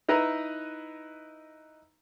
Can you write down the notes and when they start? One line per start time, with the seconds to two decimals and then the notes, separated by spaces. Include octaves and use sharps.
0.08 D#4 E4 B4 D#5 A#5